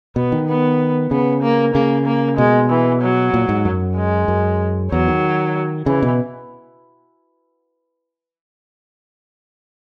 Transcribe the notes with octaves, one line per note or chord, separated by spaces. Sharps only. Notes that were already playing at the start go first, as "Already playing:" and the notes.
B2 B3
D#3
B3
C#3 B3
A#3
C#3 A#3
A#3
B2 G#3
E3
F#3
A#2
G#2
F#2
G#3
F#2
E2 F#3
D#3
C#3 E3
B2